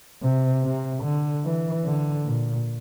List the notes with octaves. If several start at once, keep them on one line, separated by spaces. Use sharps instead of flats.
C3
C3
D3
E3
D3
A#2